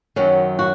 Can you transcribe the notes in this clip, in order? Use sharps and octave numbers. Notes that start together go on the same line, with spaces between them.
F#2 D#3 F#3 C#4
F#4